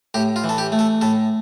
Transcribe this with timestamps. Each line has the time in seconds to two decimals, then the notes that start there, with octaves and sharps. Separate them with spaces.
0.14 A2 G4
0.36 F4
0.44 E3
0.49 A4
0.58 G4
0.72 A3
0.79 A4
1.01 A2 A4